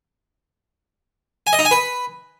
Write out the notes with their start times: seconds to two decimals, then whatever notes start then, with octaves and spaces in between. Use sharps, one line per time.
1.47 G#5
1.53 D#5
1.59 D#4
1.65 G#5
1.71 B4